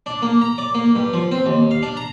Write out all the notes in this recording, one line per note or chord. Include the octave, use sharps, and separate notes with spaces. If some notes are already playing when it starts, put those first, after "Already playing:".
D4
A#3
A#5
D5
A#3
G2
F3
C4
D#2
F5
D4
A#5